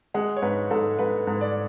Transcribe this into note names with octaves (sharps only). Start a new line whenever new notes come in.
G#3 F#5
C#5
G#2 B4
G#2 A4
G#2 B4
G#2
D5